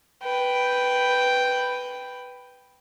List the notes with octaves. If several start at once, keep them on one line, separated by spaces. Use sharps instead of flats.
B4 G5